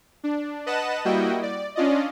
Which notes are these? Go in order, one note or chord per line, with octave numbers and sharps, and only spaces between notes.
D4
B4 D#5 F#5 A5 F#6 E7
G3 A#3 E4 F#4 D#5 G5
D5
C#4 D4 F4 D5 D#5